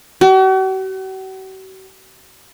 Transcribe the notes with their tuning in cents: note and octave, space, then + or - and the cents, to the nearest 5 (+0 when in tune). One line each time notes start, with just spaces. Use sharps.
F#4 +45